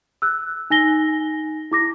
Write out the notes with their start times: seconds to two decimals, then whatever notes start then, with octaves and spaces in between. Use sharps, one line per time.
0.22 E6 F#6
0.70 D#4 G#5 A#6 G7
1.72 E4 D6 A#6